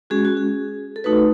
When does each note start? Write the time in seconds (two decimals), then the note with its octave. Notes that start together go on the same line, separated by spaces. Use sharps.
0.10 G#3 C#4 F#4 G#4
0.25 F#4
0.37 G#4
0.96 A4
1.04 A3 D#4 F#4 B4